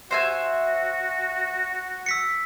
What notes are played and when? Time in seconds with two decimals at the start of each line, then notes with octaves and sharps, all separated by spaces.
0.11 F#4 C5 E5 G#5
2.06 E6 B6 C#7